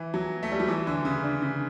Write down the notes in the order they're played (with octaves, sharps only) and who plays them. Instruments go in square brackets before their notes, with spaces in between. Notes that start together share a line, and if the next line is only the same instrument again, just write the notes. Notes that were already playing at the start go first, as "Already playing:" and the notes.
Already playing: [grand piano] E3
F#3
A3
G3
F#3
E3
D3
C#3
D3
C#3